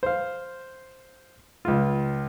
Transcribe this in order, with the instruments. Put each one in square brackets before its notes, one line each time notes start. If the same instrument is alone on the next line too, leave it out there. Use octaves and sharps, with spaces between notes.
[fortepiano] C5 F5
C#2 F4